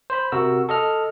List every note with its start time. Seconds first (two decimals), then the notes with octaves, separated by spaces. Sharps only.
0.10 C5 B5
0.32 C3 F#4 A#4 E6
0.69 A4 D#5 F6